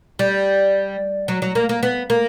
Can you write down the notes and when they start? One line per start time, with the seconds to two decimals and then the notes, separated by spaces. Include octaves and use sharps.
0.19 G3
1.28 F#3
1.42 F#3
1.55 A#3
1.69 A#3
1.83 B3
2.10 A#3